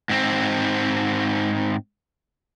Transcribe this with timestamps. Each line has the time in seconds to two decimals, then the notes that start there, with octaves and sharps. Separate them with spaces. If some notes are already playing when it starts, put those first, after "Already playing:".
0.09 G#2 C4